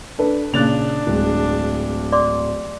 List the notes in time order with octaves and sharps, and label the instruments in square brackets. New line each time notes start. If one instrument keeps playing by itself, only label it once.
[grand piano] D4 [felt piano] A4 B4
[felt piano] A#2 C#3 [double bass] D4 [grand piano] F#6 A6 F7
[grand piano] D1 [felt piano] G#3
[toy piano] D5 C6 D6